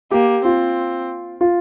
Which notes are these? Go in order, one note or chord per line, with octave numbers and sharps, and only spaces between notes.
A#3 G4
C4 F4
F4